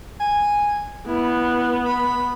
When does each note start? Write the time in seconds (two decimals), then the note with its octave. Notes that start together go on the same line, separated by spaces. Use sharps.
0.20 G#5
1.07 B3 E4
1.85 B5